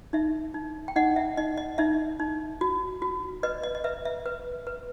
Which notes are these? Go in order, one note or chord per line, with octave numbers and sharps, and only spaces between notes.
D#4 E5
D#4
G5
D#4 D#5 F#5
E5
D#4 D#5
D#5
D#4 E5
D#4
F#4
F#4
B4 D#5
D#5
D#5
B4 E5
E5
B4
B4